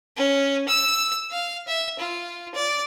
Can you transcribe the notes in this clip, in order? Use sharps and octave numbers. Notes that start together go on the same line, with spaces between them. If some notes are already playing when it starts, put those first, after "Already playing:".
C#4
E6
F5
E5
F4
D5